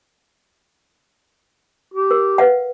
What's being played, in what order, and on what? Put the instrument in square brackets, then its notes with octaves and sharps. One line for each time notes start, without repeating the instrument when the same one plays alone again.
[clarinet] G4
[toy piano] A#4
B4 F5 F#5